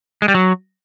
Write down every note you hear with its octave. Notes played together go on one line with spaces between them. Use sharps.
G#3
G3
F#3